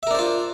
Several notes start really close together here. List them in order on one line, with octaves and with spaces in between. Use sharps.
E5 A#4 D4 C5 F4